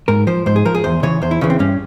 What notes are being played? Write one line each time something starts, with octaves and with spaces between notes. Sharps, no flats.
G#2 A#4
F3 C5
G#2 C5
G#4
F3 A#4
G#4
E2 C5
C#3 E3 C#5
E2 C5
E4
C#3 E3 C#4
C4
G2 C#4